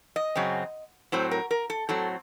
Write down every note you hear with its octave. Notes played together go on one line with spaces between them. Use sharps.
D#5
F#2 C#3 F#3 C4
A2 F#3 C4 C5
A#4
A#4
A4
A2 F#3 C4 A4